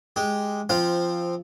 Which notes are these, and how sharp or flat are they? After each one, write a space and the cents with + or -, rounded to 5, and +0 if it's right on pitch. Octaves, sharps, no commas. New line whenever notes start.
G#3 +0 G4 +0
F3 -10 C4 +0 F5 +0